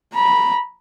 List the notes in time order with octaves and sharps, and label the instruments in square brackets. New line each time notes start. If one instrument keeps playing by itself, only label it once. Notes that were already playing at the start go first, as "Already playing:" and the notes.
[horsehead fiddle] A#5 B5